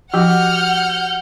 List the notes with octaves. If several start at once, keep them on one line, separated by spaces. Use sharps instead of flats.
F3 F#4 G4 F#5 F6 G6